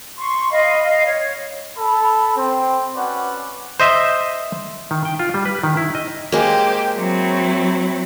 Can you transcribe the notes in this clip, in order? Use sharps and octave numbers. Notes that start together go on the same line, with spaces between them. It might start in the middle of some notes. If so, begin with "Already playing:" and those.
C6 C#6
D#5 F5 B5
D#5 F5
C#5
A4 B5
C4
C#4 F#4 B4 D5 F#5
C5 D#5 E5
D#3
G5
F4
G3
B4
D#3
E4
D#5
G#3 A#3 G4 C5
F#3 C4 E4